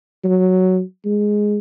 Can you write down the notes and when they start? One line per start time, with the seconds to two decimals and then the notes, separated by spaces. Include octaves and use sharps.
0.24 F#3
1.05 G#3